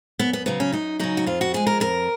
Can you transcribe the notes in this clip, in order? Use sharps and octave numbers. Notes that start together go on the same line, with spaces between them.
F#2 B3
B3
C#3 F#3 B3
C#4
F#2 D#4
C#3 F#3 D#4
F#4
F2 F4
F#4
F3 G#3 G#4
A#4
F2 A#4